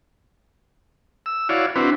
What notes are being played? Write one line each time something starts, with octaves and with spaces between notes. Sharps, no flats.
E6
E4 F#4 C#5 D5 F5
C4 D4 E4 F#4 B4